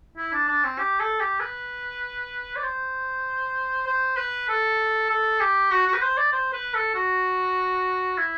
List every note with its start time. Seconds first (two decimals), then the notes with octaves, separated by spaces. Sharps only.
0.17 E4
0.33 D4
0.48 D4
0.64 C4
0.78 G4
1.00 A4
1.20 G4
1.40 B4
2.56 D5
2.63 C5
3.86 C5
4.17 B4
4.49 A4
5.10 A4
5.41 G4
5.71 F#4
5.87 F#4
5.94 B4
6.02 C5
6.17 D5
6.32 C5
6.53 B4
6.74 A4
6.94 F#4
8.18 E4